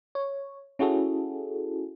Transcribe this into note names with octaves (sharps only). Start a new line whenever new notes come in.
C#5
C#4 E4 F#4 G#4 A4